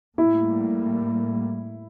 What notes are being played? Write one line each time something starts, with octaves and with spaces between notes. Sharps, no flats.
A2 G3 A#3 E4